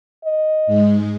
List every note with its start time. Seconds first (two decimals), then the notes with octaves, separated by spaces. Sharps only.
0.24 D#5
0.67 G#2 G#3